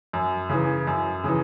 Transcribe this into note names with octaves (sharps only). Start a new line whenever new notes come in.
F#2
C#3 E3
F#2
C#3 E3